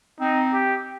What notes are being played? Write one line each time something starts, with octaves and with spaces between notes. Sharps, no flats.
C4 D#4
G4